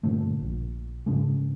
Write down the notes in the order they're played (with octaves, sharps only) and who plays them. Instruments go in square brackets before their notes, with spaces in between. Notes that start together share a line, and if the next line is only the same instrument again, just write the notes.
[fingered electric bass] G2 A#2 D3 A3
A#1
G#2 C#3 G#3